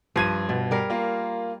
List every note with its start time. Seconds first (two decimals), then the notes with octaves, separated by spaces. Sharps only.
0.16 G2 F3 G#6 D#7
0.49 B2
0.71 G3 A#4 F5
0.90 A#3 F4